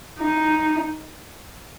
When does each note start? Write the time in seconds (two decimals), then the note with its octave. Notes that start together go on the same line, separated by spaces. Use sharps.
0.19 D#4